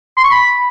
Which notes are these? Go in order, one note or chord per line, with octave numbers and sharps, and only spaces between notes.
C6
C#6
B5